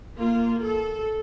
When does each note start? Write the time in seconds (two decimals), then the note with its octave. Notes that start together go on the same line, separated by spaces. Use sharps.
0.17 A#3 F4
0.59 A4